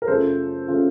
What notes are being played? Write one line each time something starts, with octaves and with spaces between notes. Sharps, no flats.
A#4
F#2 C#3 A3 C#4 F4 A4 C5
C#3 A3 C#4 F4